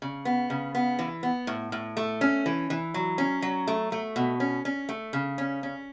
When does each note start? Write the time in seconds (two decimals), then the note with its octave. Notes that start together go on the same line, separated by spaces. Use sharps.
0.02 C#3
0.25 B3
0.50 C#3
0.75 B3
0.99 E3
1.23 B3
1.47 A2
1.72 A2
1.97 A3
2.21 C#4
2.46 E3
2.70 E3
2.94 F#3
3.18 C#4
3.42 F#3
3.67 A3
3.92 A3
4.16 B2
4.40 C#4
4.65 C#4
4.89 A3
5.13 C#3
5.38 C#4
5.63 C#4